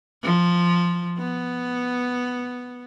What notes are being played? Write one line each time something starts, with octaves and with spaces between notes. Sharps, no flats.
F3
B3